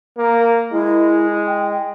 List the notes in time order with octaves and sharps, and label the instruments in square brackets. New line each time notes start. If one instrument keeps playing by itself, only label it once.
[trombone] A#3
[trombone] G#3 [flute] E4
[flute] G5